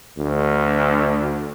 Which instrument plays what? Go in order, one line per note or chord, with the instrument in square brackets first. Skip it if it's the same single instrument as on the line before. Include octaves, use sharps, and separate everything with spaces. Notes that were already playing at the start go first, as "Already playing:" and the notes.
[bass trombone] D2